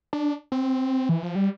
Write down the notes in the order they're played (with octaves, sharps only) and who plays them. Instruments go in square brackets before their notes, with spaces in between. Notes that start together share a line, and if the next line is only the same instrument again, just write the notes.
[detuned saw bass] D4
C4
E3
F3
G3